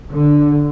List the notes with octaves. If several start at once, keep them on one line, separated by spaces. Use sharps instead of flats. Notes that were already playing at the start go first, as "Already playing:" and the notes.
D3